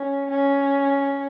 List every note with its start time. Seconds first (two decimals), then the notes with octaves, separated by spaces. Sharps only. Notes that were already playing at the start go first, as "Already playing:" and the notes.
Already playing: C#4
0.31 C#4